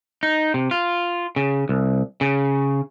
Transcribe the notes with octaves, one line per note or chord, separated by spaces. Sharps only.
D#4
C3
F4
C#3
C2
C#3